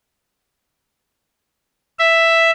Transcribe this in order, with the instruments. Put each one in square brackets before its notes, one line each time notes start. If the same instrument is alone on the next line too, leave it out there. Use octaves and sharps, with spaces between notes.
[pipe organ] E5